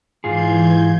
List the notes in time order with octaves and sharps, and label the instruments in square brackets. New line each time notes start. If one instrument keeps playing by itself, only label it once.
[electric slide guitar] G#2 F4 G#4 [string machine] E3 G6 G#6